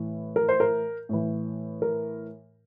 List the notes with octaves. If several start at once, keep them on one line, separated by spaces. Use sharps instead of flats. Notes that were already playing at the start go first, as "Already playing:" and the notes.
Already playing: A2 E3
A#4
C5
A#4
A2 E3
A#4